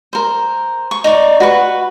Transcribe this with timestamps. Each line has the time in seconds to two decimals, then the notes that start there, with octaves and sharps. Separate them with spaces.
0.13 A#4 C5
0.91 C#6
1.04 D#4 D5 C#6
1.40 F#4 B4 C#6